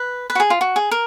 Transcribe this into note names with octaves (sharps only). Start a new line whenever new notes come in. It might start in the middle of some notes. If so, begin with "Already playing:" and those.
Already playing: B4
B4
F#4
G#4
F4
F#4
G#4
A#4